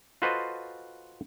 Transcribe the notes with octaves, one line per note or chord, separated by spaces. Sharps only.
F4 F#4 A4 B4 C5 D#5